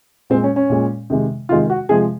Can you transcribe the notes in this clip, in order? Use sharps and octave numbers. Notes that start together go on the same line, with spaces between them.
A#2 G#3 C4
C#4
C#4
A#2 G#3
C3 D#3 G#3
C3 D#3 G#3 F4
F#4
C3 F3 G#3 G#4